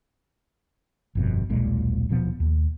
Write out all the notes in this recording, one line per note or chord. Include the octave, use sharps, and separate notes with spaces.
G1 F2 B2
D#1 B1 A#2 G#3
D#1 B2 F3 B3
D#2